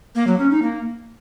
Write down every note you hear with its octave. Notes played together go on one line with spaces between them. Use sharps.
A#3
F#3
C#4
D#4
A#3